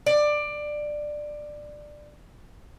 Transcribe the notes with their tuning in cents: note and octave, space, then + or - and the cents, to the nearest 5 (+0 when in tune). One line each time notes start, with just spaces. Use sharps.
D5 +15